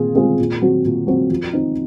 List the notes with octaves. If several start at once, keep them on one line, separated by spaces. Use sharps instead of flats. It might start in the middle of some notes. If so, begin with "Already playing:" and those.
Already playing: A#2 C4 F4 G#4
G#3 C4 F4 G#4
A#2
F#3 C4 F#4
A#2
F#3 C4 F#4
F3
C4 D#4